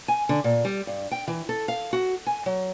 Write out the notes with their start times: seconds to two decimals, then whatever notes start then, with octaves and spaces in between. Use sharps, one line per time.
0.08 G#5
0.29 D3
0.44 A#2
0.65 G3
0.87 G2
1.11 G5
1.28 E3
1.49 A4
1.68 F5
1.93 F#4
2.27 G#5
2.46 F#3